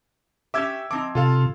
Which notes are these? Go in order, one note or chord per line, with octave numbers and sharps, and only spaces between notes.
C#4 G4 E5 D6 E6 G#6
F3 C4 D#4 D6
C3 F4 A4 F5